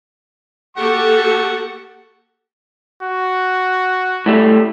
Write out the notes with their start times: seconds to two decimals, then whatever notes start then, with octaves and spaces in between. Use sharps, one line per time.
0.77 A#3 G4 A4 F#5 C#6
3.03 F#4
4.26 A2 G3 A3